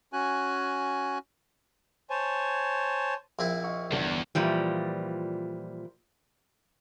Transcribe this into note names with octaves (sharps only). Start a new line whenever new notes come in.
C#4 F#4 G#5 F#6
C5 C#5 G#5 A5
A#1 C4 E4
D#5 F5 C#6
G1 E2 D4
A#2 E3 F3 G3